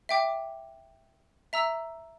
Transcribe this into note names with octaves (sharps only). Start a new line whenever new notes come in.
E5 G5 D6
E5 A#5 E6